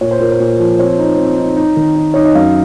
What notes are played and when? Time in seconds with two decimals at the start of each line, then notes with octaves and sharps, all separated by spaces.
0.01 A#2 C#5
0.11 C5
0.20 A#2 A#4
0.32 C5
0.40 A#2
0.59 F3
0.79 C4 C#5
0.98 D#4
1.18 C4
1.38 D#4
1.57 D#4
1.77 D#3
1.96 D#4
2.14 D#4 C#5
2.24 D#5
2.35 F#2 F5